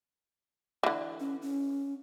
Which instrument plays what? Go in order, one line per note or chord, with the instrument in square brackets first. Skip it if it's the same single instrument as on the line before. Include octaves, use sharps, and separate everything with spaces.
[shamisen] D3 E3
[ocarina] C#4
C#4